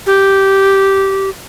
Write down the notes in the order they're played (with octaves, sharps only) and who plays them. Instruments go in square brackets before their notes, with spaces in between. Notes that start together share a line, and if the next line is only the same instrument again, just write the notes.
[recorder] G4